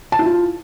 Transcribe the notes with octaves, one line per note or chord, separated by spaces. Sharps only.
A5
E4
F4